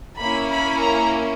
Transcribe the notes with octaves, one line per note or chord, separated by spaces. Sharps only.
A#3 C#4 E4 B5
B5
A#5